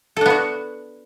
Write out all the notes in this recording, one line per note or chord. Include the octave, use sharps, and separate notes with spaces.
B3 D4 F#4 A4